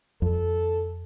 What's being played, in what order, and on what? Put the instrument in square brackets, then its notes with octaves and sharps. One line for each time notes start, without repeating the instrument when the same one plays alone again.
[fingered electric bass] F2 [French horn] A4